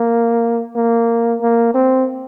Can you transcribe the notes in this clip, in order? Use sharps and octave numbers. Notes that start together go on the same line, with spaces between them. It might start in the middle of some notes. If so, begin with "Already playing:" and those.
Already playing: A#3
A#3
A#3
C4